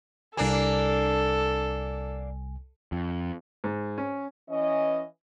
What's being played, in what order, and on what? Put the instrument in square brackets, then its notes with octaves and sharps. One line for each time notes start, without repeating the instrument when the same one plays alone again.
[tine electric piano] C2 G#5 [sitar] A#3 D4 [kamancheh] A4
[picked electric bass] F2
[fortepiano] G#2
C#4
[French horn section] E3 C#4 D#5